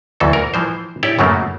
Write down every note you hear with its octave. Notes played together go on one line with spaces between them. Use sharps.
D2 E3 F#3 A4
A#4
E3 F3 C5
E4 G4 C#5 D5 G5
F#2 C#3 F#3 A3 A#3